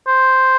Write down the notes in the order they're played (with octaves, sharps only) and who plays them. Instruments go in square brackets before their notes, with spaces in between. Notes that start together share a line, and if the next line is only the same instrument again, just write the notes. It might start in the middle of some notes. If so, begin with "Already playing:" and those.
[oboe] C5